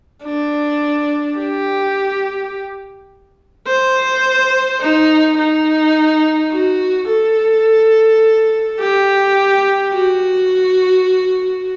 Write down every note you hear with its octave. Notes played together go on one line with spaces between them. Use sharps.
D4
G4
C5
D#4
D#4
F#4
A4
G4
F#4